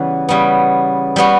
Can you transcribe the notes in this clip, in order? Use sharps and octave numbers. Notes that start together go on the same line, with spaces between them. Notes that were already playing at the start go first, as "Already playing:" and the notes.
Already playing: C#3 E3 G3 B3 F#4
C#3 G3 B3
G3 B3 F#4